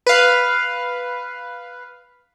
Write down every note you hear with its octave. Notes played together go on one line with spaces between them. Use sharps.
B4 F5